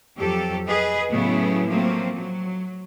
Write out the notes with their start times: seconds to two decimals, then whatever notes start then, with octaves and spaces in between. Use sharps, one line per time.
0.17 F2 F#3 G4 A4
0.67 G#4 B4 D#5
1.11 A2 C#3 F#3 A3 B3 E4
1.69 F3 F#3 A3 A#3 C4
2.16 F#3